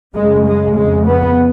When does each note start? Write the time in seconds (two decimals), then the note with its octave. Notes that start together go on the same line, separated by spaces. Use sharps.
0.14 F#2 G#3
0.19 C#3
0.46 G#3
0.76 F2 C#3 G#3
1.06 B3